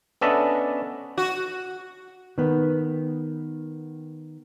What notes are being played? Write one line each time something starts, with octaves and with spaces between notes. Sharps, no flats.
B3 C#4 D4 A4 D#5 E5
F#4
D#3 B3